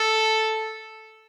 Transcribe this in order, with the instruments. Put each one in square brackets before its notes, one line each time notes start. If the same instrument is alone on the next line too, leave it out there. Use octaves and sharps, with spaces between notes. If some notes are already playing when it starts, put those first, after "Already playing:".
Already playing: [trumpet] A4